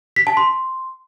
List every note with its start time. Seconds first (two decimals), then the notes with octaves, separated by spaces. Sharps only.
0.16 B6
0.27 A5
0.37 C6